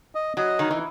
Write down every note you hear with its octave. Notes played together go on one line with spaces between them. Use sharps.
D#5
F#3 D#5
D#3 D#4
E3